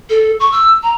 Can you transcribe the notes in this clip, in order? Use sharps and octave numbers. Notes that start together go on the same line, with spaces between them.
A4
C#6
E6
A#5